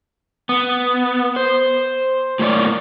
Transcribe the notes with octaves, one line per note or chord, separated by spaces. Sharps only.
B3
C5
A2 A#3 E4 C#5 D5